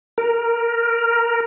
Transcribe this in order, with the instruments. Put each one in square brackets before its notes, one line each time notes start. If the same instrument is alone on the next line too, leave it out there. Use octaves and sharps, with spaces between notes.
[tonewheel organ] A#4